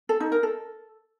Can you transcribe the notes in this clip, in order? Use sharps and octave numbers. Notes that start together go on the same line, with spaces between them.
A4
D#4
A#4
A4